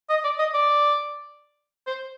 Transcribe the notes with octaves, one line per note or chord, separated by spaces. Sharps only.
D#5
D5
D#5
D5
C5